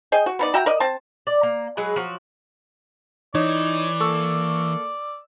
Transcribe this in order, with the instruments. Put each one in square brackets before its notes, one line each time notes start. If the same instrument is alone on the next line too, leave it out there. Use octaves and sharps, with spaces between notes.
[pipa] G#4 D#5 G5
F#4
B3 D#4 D5
F#4 E5 G5 A#5
A#4 D5 D#5
C4 A5
[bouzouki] D5
A#3
F#3 G#3 G#4 B4
F3 F#3 F#4
[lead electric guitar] E3 [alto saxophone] D#4 [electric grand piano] C#5 [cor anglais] D5
[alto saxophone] A#3 [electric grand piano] A4 C#6 E6